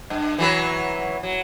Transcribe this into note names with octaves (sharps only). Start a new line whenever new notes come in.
G2
E3 F#3 B4
F#3